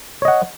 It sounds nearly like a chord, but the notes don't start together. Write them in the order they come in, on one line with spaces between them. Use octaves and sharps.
C#5 D#5 F#5